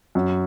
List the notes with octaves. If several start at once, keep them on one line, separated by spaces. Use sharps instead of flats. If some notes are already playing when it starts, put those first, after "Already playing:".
F#2